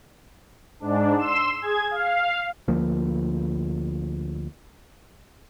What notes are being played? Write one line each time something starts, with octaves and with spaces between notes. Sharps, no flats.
G#2 D4
C6 E6 E7
G#4 G#6
F5
D2 F3 A#3